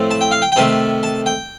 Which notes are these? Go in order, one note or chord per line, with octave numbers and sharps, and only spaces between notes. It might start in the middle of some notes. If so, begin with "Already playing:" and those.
Already playing: A2 F3 A3 C4
A5
G5
F5
G5
G5
C3 D#3 A3 A5
A5
G5